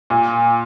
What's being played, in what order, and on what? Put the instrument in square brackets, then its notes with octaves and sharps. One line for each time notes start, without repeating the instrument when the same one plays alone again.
[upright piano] A#2